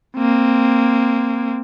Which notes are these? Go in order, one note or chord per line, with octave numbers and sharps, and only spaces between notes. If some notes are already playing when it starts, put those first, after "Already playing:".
A#3 C4